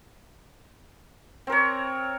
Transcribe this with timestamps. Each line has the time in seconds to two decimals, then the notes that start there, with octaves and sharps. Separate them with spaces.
1.47 C4
1.50 A#4
1.52 C#5